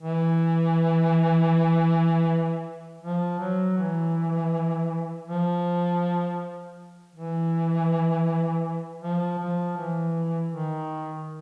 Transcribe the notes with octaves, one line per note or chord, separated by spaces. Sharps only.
E3
F3
F#3
E3
F3
E3
F3
F3
E3
D#3